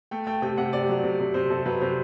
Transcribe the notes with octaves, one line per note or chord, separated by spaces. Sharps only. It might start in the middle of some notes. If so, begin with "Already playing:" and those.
A3 G5
A3 G5
C3 G5
C3 F#5
C3 D5
F#3
C3
C3
C3 C5
C3 A4
F#3 B4
C3 C5